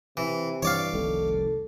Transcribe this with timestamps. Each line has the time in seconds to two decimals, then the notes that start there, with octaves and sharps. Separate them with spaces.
0.17 C3 E3
0.63 G2 E3 C#5 D5 F5
0.93 F1 C2 D#3 A4